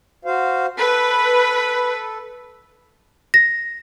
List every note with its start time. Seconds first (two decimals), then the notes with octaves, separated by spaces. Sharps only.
0.25 F#4 C5 F5
0.78 A4 B4
3.34 A#6